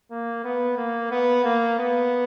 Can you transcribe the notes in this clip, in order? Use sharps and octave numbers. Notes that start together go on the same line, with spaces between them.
A#3
B3
A#3
B3
A#3
B3